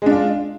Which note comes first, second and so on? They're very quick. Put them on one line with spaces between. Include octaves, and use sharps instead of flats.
G#3 D4 F4